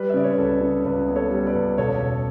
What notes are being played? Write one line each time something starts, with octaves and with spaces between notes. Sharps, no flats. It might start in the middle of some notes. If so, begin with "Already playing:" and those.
Already playing: G3 B4
E5
C#3 D5
C#5
B4
C#2 A4
C#3
C#2 B4
B3
A4 C#5
G3
B4 D5
C#2
E1 A4 C#5
E1